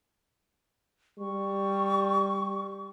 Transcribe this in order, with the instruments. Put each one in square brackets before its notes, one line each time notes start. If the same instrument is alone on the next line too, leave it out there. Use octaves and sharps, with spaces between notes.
[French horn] G3 [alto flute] C#6